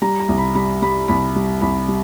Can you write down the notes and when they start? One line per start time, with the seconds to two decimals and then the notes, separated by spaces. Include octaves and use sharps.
0.02 G3 A#5
0.20 A#5
0.29 C2
0.38 B5
0.55 G3 B5
0.82 G3 B5
1.08 C2 B5
1.36 G3
1.61 C2 B5
1.88 G3